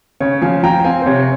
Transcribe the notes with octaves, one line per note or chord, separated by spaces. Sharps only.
C#3 C#5
F3 F5 G#5
F3 G5 A#5
G5
C4 F5 G#5
C5
C3 C#5